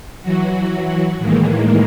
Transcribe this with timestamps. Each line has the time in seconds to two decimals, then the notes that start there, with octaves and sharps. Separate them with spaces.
0.22 E3 F#3 F#4
1.18 A2 D#3 E3 G#3 A#3